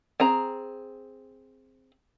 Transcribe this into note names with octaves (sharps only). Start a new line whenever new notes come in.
C4 G#4 A#5